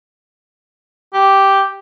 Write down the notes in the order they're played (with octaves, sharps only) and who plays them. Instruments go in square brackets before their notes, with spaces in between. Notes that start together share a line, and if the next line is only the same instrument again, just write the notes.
[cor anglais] G4